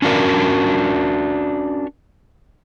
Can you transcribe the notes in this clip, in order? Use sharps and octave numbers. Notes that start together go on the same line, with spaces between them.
C#4 D4 F#4 A#4 D5